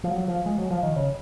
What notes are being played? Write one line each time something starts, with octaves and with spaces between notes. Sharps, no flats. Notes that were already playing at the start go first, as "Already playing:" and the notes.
F3
F#3
F3
G#3
F#3
F3
D#3
C#3